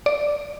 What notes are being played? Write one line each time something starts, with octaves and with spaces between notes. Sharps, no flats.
D5